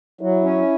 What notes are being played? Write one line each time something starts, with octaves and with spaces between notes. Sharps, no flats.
F#3 E4
C#4